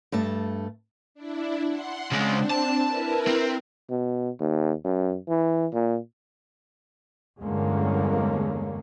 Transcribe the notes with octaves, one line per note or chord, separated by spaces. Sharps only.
G2 A3 A5
D4 E4
F#5 C6
C#3 G#3 C4 D4
A5
E4 A#4 B4
C4
B2
D#2
F#2
E3
A#2
E2 G2 D3 G#3 A#3 C#4